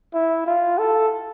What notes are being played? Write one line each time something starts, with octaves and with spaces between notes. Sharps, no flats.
E4
F4
A4